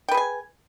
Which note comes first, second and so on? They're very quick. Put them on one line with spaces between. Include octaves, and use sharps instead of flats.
G5 B4 G#4 G#5